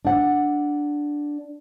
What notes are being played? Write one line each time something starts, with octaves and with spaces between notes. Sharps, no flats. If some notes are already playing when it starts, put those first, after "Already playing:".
D4 F#5